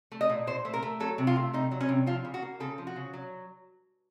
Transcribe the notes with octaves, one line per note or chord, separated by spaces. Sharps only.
A3
D#5
A#2
A#2 C5
A3
A#4
A3
F#3 A4
C3
F4
A3
C3 D#4
F#3
C#4
C3
F3 F4
C#3
F#4
A#3
C#3 A4
F3
F#4
C#3
F#3